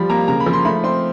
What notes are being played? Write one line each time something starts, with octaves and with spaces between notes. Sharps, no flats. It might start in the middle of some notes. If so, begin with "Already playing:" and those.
Already playing: F3 G3 B5
A#3 A#5
C#3 A#5
B5
F3
C6
A3 B5
C4 C6